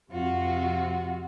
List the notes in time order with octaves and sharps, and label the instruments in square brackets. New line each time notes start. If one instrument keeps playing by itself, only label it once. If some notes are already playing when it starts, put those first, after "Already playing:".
[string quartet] F2 C3 F4 F#4